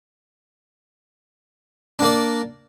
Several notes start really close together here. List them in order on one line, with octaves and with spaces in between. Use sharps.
D4 A#3 D5